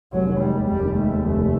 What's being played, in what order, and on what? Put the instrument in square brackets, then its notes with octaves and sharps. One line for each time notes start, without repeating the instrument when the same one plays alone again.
[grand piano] F1 [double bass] F#3
[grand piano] D#3
[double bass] G3 [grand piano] G#3
[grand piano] D#2
[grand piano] F1 [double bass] G3
[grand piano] D#3
[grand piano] G#3 [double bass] A3
[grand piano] D#2
F1
D#3